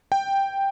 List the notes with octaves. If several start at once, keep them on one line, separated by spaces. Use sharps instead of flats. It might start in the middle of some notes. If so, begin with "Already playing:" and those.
G5